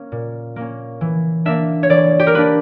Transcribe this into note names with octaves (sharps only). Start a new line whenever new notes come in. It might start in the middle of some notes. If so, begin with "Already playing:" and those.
Already playing: A#3 C#4
A#2
A#3 C#4
E3
A#3 D4 E5
C#5
E3 D5
G4
A#4
A#3 D4 B4